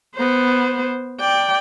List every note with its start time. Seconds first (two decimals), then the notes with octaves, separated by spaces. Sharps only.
0.15 B3 C5
1.20 D5 G5